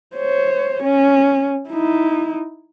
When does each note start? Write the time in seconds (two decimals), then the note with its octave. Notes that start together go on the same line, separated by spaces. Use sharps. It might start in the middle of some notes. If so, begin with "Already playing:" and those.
0.16 C5 C#5
0.83 C#4
1.70 D#4 E4